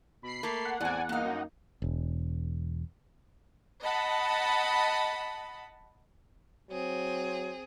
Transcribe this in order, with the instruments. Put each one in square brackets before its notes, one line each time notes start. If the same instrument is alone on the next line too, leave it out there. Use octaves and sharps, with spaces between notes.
[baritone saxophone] B2 [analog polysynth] B5 C7
[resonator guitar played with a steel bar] A3 A4 [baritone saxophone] A#3
[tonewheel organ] F#5
[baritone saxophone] E2 [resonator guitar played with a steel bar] A2 C4 [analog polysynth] D5 G#5
[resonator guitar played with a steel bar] G2 F5 [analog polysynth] A#3 D#4
[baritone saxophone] F#2
[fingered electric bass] E1
[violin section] D#5 F#5 A5 B5
[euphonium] F#3 [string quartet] C4 G#4